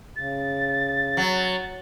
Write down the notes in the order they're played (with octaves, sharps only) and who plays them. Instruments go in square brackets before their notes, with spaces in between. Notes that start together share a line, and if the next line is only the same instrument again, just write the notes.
[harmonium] C#3 [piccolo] A6
[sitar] F#3